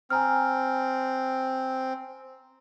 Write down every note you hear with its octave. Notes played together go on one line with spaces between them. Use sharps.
C4 G#5 A#5 F6